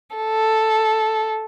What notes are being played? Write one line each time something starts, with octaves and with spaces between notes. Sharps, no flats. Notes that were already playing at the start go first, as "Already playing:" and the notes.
A4